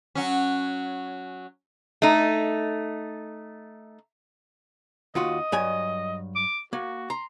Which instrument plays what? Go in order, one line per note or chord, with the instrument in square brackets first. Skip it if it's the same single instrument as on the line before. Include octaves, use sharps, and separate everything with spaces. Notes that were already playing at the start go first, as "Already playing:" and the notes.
[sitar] F#3 C#4
[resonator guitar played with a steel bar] A3 D#4
[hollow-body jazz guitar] D#2 F4 F#4 [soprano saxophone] D#5
[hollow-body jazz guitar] G2 F#3 G#5
[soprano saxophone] D6
[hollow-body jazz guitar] A#3 [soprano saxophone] F#4
[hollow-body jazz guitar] A#5 [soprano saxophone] C6